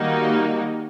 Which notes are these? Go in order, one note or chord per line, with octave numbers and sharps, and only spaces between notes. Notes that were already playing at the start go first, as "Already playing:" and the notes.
Already playing: D#3 G3 A#3 D#4 F#4